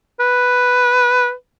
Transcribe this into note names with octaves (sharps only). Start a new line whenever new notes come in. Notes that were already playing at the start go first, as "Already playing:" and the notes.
B4